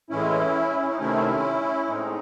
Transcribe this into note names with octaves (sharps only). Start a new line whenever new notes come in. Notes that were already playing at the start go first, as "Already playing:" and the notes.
A2 E3 G#3 C#4 E4
C#4
D#4
C3 D#3 A3 C4 C#4 E4
A2 G#3 C4 D#4